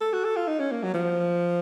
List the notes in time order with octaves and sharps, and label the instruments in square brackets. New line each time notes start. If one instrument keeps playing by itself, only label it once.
[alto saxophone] A4
F#4
A4
F4
D#4
C#4
A#3
F#3
F3